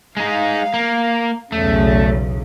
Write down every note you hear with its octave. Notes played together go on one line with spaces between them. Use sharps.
G#3 D#4 F5
A#3
B1 E2 C#3 A3